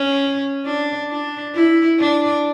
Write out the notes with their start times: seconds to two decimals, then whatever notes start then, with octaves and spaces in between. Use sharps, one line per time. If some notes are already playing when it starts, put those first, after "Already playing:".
Already playing: C#4
0.66 D4
1.10 D4
1.55 E4
1.99 D4